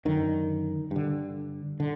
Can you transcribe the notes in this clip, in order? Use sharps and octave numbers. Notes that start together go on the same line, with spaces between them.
F#2 D3 D#3
G2 D3
D3